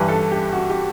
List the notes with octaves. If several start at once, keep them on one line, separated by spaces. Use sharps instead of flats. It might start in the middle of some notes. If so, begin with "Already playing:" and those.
Already playing: G2 E3 G3 B4
A4
G4
F#4
G4